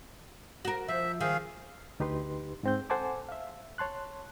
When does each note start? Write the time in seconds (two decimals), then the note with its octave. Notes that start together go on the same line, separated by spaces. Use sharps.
0.65 F#4 A#4
0.88 F3 E5
1.20 D#3 G#4 F5
2.00 D2 D#4 G4 B4 C6
2.63 G#2 C4 G6
2.90 A4 C5 F#5 G#5 A5 D6
3.29 E5 F5
3.78 C#5 A5 C6 F#6